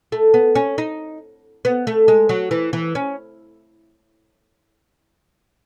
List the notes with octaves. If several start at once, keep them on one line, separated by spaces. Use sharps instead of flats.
A3
B3
C#4
D#4
B3
A3
G#3
F#3
E3
E3
C#4